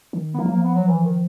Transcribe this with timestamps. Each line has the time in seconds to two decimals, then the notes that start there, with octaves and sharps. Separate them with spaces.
0.13 D#3
0.34 B3
0.38 F3 A#3
0.46 F#3
0.50 A#3
0.55 F3
0.63 B3
0.75 F#3
0.87 E3
1.04 D#3